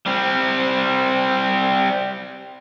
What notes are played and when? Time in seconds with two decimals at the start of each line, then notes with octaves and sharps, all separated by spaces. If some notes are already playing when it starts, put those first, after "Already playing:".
0.06 G3 C4